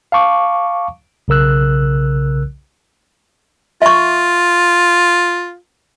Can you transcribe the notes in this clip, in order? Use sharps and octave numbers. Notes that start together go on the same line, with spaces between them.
F5 A5 C#6 D6
B1 C#3 A#4 E6 F#6
F4 E5 C#6